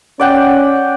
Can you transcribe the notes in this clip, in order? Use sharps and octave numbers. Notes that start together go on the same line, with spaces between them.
C#4 D5 F#5 G5